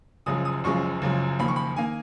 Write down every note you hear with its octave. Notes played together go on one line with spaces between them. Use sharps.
F#1 F#2 C#3 F3 G#3 D#6
D#6
F#1 F#2 C#3 F3 G#3 C#6
F#1 F#2 C#3 F3 G#3
F#1 F2 D#3 A#3 B5
C#6
B5
D#3 A#3 G#5